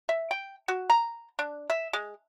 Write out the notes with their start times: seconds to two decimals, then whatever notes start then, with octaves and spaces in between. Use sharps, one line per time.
0.09 E5
0.31 G5
0.68 F#4
0.90 A#5
1.39 D4
1.70 E5
1.93 G#3